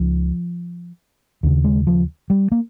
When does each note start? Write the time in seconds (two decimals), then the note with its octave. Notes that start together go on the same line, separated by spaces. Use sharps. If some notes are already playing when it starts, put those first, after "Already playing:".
Already playing: C#2 C#3 F3
1.43 D#2 C#3
1.64 G#3
1.87 F3
2.30 G3
2.52 A#3